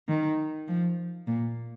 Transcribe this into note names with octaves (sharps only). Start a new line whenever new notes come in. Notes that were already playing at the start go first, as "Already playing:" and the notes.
D#3
F3
A#2